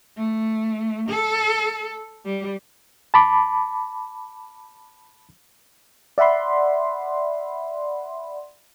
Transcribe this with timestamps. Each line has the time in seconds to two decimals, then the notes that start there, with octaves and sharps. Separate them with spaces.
0.17 A3
1.09 A4
2.25 G3
3.14 A5 B5 D6
6.18 D5 E5 F#5 B5 C6